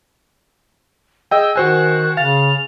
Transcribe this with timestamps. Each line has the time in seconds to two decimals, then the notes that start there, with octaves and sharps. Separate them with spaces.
1.31 G#4 D#5 G5 E6
1.56 D#3 F#4 C5 G#5 F#6
2.17 C#3 F5 A6 F7